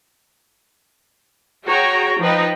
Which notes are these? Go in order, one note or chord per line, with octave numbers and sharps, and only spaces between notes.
F#4 G#4 C#5 G5 A#5
F3 D#4 B4 G5